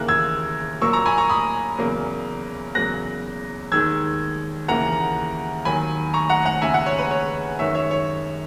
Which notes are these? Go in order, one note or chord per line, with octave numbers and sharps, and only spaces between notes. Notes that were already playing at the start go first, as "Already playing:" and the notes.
Already playing: D#2 C#3 E3 A#3 F#6
E6 G#6
A#2 F#3 A#3 C#6 E6
A#5 C#6
G#5 B5
A#5 C#6
B5 D#6
E2 C#3 F#3 A#3
E2 C#3 F#3 A#3 F#6 A#6
D#2 D#3 G#3 E6 G#6
D#2 C#3 E3 A#3 F#5 A#5
D#2 D#3 F#3 G#5 B5
A#5 C#6
F#5 A#5
F#5 A#5
D#2 C#3 G#3 E5 G#5
F#5 A#5
C#5
B4
C#5
F#2 D#3 G#3 C#5 E5
C#5 E5
C#5